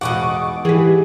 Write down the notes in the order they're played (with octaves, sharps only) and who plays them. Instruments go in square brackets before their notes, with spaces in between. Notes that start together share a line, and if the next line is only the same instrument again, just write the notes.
[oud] E2 B2 [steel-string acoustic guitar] G#2 D#5 F#5 [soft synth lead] C#6 [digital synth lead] D6
[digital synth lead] E3 [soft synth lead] G4 [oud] G#4 B4